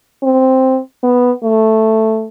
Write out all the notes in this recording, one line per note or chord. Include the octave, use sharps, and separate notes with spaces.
C4
B3
A3